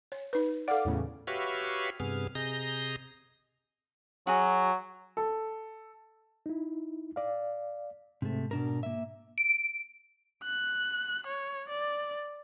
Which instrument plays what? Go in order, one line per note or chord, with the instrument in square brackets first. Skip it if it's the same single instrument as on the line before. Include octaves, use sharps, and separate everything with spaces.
[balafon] C#5
D#4 B4
[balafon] A4 F#5 [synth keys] D5 F5 D6
[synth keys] E2 A2 C#3
[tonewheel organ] F#4 G4 B4 C#5 E5 F5
G2 C3 B3 G#4 F6
C3 G#4 D#5 A#5 G6 A#6
[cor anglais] F#3 [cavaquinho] F#4 G#4
[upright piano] A4
[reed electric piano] D#4 E4
D5 F5
[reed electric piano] G#2 [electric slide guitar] C3 A3
[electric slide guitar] B2 D4 A#4
A#3 E5
[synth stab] D7
[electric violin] F#6
C#5
D5